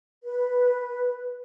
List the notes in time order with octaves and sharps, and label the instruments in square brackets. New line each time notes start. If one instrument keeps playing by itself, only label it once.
[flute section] B4